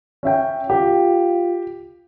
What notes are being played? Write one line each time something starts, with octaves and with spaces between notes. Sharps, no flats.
C#4 E5 G5
F4 G4